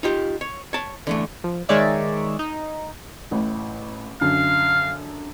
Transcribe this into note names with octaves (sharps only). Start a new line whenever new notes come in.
D#4 F4 G4
C#5
C#5 A5
D3 E3 A3
F3
D#3 G#3 D#4 C#5 D5 E5
D#4
A1 A2
F#2 D3 F5